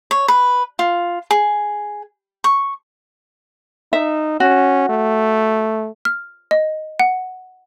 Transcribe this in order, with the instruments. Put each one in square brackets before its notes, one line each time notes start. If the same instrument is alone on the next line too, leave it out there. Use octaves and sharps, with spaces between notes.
[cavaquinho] C#5
B4
F4
G#4
C#6
[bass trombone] D#4 [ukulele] E5
[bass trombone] C#4 [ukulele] F#4
[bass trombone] A3
[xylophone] F6
D#5
F#5